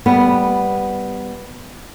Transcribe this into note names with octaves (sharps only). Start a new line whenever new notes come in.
G3 B3